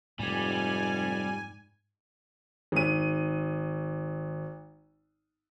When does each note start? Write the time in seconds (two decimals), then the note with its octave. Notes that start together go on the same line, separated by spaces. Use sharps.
0.19 F1 G#2 G3 G#5
2.72 G#1 D#7